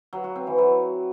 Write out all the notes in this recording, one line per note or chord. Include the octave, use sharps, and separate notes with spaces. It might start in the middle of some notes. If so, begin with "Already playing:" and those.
F#3
F#4
C4
E3
F#3